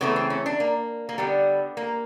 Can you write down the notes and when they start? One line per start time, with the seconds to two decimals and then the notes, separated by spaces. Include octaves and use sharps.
0.01 C#3 E3 A3 B3
0.16 C4
0.30 C#4
0.46 D4
0.60 A#3
1.09 A#3
1.18 D3 G3 B3
1.77 A#3